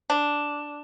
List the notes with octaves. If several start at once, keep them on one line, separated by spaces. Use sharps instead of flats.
D4